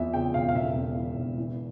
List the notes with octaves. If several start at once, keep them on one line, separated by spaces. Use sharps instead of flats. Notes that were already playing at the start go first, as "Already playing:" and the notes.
Already playing: E2 F3 E5
C#3 G5
E1 F5
F5
E1 E5
E2
E3
E1
E3